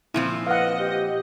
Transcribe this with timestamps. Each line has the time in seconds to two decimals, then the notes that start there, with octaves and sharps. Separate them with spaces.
0.14 A#2 F3 C4 E4
0.47 B4 D#5 F5 F#5
0.79 G4